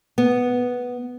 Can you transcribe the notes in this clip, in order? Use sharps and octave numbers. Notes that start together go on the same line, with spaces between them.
B3